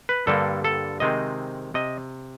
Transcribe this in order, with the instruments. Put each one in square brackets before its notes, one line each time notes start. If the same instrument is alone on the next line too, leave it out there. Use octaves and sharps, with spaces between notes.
[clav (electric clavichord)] B4
G2 D3 G3 A#3 A4
A4
C3 D#3 G#3 C4 D#5
C3 D#5